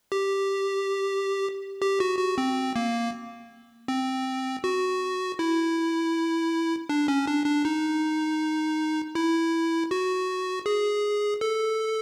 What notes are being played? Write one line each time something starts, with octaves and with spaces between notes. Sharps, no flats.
G4
G4
F#4
F#4
C4
A#3
C4
F#4
E4
D4
C#4
D4
D4
D#4
E4
F#4
G#4
A4